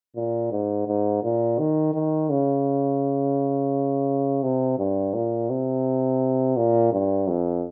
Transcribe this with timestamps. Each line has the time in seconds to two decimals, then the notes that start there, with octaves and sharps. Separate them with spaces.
0.16 A#2
0.52 G#2
0.87 G#2
1.24 A#2
1.59 D#3
1.94 D#3
2.30 C#3
4.43 C3
4.78 G2
5.14 A#2
5.50 C3
6.57 A#2
6.92 G2
7.28 F2